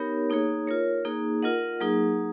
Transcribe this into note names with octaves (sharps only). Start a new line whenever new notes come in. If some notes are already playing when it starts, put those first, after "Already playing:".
Already playing: B3 D#4 G4 A#4 C#5
A#3 D#4 G#4 C#5
F4 A#4 C#5
A#3 D#4 G#4
F4 A#4 D#5 F#5
F#3 A#3 D#4 G#4